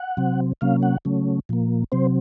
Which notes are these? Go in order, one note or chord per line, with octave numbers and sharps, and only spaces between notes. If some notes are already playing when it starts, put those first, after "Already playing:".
Already playing: F#5
C3 F#3 C4
C3 F#3 A#3 C#4 F5
F#5
C#3 F#3 A3 C#4
A#2 F3 A#3
C3 F#3 C4 C5